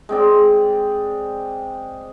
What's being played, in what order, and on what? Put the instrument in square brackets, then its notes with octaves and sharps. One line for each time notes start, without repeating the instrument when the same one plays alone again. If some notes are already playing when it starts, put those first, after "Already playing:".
[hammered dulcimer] G#3 C4 D5